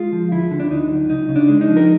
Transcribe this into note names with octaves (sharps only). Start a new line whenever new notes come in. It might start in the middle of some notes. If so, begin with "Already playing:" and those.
Already playing: G#3 F4
F3
D2 E4
D3
D4
D2 D#4
F#3
C#2 D#4
C#3
D4
G#3
D#4
F3
A#4